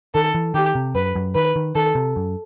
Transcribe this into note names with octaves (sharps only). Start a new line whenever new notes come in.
D#3 A4
E3
D#3 G4
C3
F#2 B4
F#2
D#3 B4
D#3
D#3 A4
C3
F#2